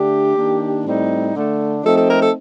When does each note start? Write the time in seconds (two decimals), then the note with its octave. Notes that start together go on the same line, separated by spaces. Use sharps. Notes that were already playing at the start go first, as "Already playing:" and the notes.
Already playing: D3 A3 D4 G4
0.35 D#3 A#3 D4
0.84 A2 G3 C4 D#4
1.34 D3 A3 D4
1.83 F3 A3 C4 D#4 A4
1.96 A4
2.08 A#4
2.21 A4